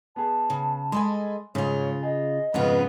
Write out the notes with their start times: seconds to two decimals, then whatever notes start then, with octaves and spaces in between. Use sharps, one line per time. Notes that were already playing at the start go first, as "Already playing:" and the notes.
0.16 B3 G#4 A5
0.50 C#3
0.92 G#3 A4 D#5 G#5 B5 C6
1.55 G#2 C#3 F4 C#5
2.03 G#4 D#5
2.54 F2 G#2 C#3 B3 C#4 F4 B4